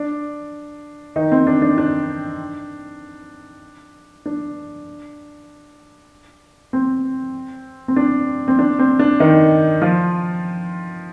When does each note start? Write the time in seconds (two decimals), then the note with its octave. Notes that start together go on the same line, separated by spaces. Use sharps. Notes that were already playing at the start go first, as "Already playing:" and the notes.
Already playing: D4 D5
1.16 D#3 D#4
1.32 C4
1.47 D4
1.62 D4
1.78 D4
4.26 D4
6.73 C4
7.88 C4
7.96 D4
8.48 C4
8.59 D4
8.79 C4
8.99 D4
9.20 D#3 D#4
9.82 F3 F4